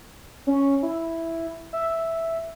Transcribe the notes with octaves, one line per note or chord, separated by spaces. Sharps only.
C#4
E4
E5